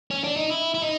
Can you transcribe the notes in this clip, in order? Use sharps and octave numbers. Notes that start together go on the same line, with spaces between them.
C#4
D4
D#4
E4
E4
D#4